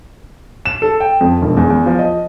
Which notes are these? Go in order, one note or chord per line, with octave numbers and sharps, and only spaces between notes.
E7
A4
G5
F2
E1
E2
E2
F3
D#5